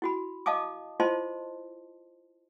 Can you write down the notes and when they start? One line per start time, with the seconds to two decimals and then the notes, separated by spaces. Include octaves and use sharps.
0.02 E4 F#4 B5
0.46 D#5 F5 A5 D6 D#6
1.00 E4 F4 C5 D#5 A5 C6